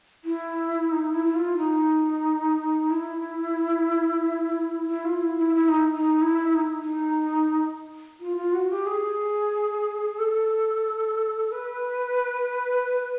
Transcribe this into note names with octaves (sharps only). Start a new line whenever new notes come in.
E4
D#4
E4
E4
F4
D#4
E4
E4
F4
E4
E4
E4
D#4
D#4
E4
D#4
D#4
F4
F4
F#4
G4
G#4
A4
B4